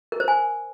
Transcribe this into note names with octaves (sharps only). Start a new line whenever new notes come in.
A#4
C5
G#5